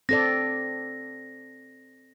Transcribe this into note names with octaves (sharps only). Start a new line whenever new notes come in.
C4 A4 D5 A#6